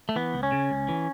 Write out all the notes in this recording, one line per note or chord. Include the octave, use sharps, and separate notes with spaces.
A3
E3 B3
C#2
C#4
C#3
C#2
E3